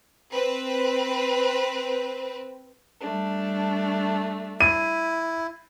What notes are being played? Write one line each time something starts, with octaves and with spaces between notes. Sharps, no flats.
C4 B4
G3 A3 D4
E4 D#7